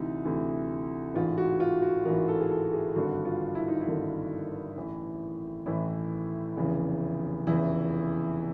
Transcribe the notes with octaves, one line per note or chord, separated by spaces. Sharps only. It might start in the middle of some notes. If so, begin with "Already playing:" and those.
Already playing: D2 C3 E3 D#4
D2 C3 E3
A1 G#2 E3 F4
F#4
F4
F#4
A1 G#2 E3 A#4
A4
G#4
A4
G#4
G#1 G2 D3 F#4
F4
E4
D#4
E4
G#1 G2 D3
A1 A2 E3
A1 A2 E3 E4
F1 E2 C#3 E3
F1 E2 C#3 E3 E4